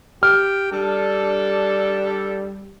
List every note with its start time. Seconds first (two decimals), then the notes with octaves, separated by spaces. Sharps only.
0.23 G4 F6
0.72 G3 D4 A4